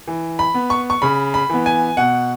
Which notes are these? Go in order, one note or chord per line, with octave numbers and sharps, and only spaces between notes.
E3
B5
B3
C#6
C#6
C#3 B5
B5
E3 B3
G#5
B2 F#5